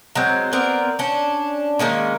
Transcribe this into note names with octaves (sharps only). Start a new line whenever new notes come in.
F#3 G#3 C4
B3 C4 A#4 D5
C#4 D4
D#3 G#3 A#3 C#4